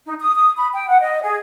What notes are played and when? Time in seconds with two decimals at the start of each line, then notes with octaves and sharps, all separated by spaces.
0.05 D#4
0.20 D#6
0.35 D#6
0.57 B5
0.74 G5
0.88 F#5
1.00 D#5
1.22 G#4